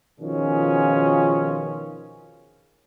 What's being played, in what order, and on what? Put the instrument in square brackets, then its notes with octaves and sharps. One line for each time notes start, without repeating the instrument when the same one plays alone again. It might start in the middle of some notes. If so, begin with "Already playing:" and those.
[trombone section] B2 D#3 F3 C#4 F4 G#4